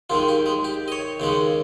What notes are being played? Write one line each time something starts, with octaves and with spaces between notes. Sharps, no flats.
D#2 D#3 G#3 F4
G4
G#3
G4
D#5
C#5
D#2 C#3 G#3